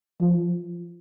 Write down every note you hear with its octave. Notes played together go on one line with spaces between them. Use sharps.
F3